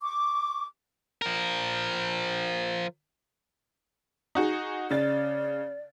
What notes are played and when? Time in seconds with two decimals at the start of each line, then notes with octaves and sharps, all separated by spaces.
0.01 C#6 D6
1.22 F3 A#4
4.35 D#4 F#4 G#4
4.91 C#3 D5 A6